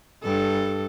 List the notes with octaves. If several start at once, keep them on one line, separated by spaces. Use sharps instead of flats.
G2 A4